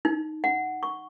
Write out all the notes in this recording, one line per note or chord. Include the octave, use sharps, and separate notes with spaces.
D#4
F#5
C#6